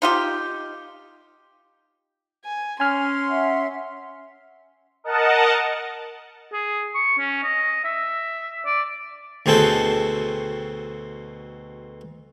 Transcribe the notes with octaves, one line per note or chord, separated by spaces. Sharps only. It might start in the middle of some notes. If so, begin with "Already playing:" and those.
D#4 F4 G4
G#5
C#4 G#5 C6 F6
E5 F#5
A#4 D#5 F#5 A5
G#4
C#6
C#4
D#5
E5
D5
D2 B2 C4 G#4 A4 G5